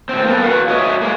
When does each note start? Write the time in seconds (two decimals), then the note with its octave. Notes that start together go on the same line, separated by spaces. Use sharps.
0.09 A2 C4
0.25 A#3 B3 A4 A#4
0.43 F#4 B4 F5 F#5
0.68 F#4 C#5 D#5 E5
1.02 G#3 A#3